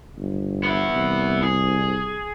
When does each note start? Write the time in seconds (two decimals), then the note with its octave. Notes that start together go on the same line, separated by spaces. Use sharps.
0.18 G1
0.63 B3 E4
0.96 C2
1.43 G#4